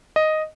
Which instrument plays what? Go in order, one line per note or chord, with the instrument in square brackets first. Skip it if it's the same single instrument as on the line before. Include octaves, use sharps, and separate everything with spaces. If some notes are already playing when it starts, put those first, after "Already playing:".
[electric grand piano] D#5